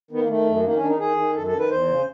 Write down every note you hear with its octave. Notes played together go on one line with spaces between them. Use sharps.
D#3 B3
A#3
D#3 A3
F#2
D#3 A#3
C#4
D#3 D4
D#4
D#3 G#4
D#3
F#2 A4
A4
D#3
B4
E2 C5
C#3